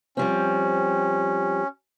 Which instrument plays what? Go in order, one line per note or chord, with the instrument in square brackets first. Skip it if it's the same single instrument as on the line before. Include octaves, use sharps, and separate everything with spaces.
[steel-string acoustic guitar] F3 G3 C4 [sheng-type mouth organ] C#4